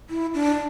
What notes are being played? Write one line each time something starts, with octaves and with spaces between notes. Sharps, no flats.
E4
D4